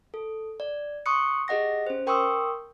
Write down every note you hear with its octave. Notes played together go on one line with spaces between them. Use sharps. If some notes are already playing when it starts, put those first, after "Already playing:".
A4
D5
C6 C#6 D#6 F#6 C#7
G4 G#4 D#5 F#5 A#6
C#4 C5
A#4 G5 C6 C#6 D#6 E6